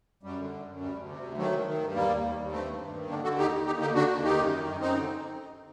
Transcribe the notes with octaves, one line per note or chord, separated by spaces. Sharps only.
F#2 G3
D3
F#2
F#2
D2 G3
D2
C3
D2
D#3 F#3 A3
D#3
D#3
G2
D#2 G3 A#3
D#2
D#2
D#2
G2 A3 C4
G2
G2
D#3
D3 A#3 D4
D3 F#4 A4
D#2 D#4 G4
D#2
D#2 D#4 G4
D3 D#4 G4
D3 D4 F#4
D#2
D#3 D#4 G4
F#2
D#3
F#2
F#2 C4 D#4
D3